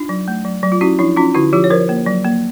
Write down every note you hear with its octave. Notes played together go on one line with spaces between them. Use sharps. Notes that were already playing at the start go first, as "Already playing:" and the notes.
Already playing: D4 D#4 F4
F#3
A3
F#3
F#3
F4
C#4 E4 F#4
F3 D4 E4
C#4 D#4 F4
D3 E4 F#4
F3 F4 G4
C#5
F3 A#4 C5
A#3
F#3
A#3